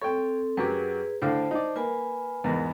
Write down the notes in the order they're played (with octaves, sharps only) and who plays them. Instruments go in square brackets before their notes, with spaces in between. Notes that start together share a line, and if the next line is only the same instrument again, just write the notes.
[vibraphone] C4 A4 [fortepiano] C#5 G5
[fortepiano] F#2 F#3 G4 [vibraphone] G#4 B4
[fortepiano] A2 D3 F5 [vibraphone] C5 A5
[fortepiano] D#4 D5
[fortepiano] A#3 [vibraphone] B4 G#5 B5
[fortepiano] E2 G#2 B3 [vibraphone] A#4